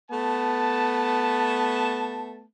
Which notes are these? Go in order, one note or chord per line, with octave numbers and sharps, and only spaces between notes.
A3 B3 A5